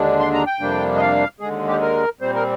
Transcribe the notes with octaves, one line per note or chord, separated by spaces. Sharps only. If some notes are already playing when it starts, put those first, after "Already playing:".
Already playing: D#2 D3 G#3 D4
C6
A#5
G5
F2 C3 G3 A#3 D4
D#5
F5
D#2 D3 G#3 G#4
G4
A#4
A#2 G3 C4 C5
A#4